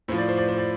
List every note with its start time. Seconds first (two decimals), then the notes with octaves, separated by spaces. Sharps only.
0.08 A2 F3 C5
0.18 D5
0.29 C5
0.38 D5
0.48 C5
0.58 D5